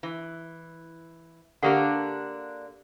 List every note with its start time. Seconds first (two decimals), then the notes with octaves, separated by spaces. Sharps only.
0.03 E3
1.63 D3 A#3 D4 G4 A4 F#5